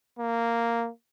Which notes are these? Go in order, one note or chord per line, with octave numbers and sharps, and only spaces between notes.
A#3